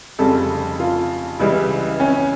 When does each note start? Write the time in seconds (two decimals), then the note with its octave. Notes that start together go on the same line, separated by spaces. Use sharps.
0.19 F1 F2 C#3 G3 A4
0.80 F4
1.39 C#2 C#3 E3 G3 E4
2.00 C#4